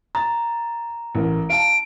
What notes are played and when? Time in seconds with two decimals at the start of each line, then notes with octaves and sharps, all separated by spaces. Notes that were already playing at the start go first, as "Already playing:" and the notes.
0.15 A#5 A6
1.15 A1 A#4
1.50 F5 A5 D7